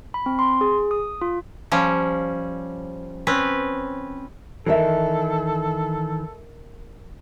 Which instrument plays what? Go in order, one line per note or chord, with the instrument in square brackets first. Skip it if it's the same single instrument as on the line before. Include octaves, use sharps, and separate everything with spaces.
[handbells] B5
C4
C6
G#4
D#6
F4
[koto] F3 G3 C#4
C4 C#4 B4
[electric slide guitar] D#3 E3 [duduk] A4 [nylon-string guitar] A#4 D#5 E5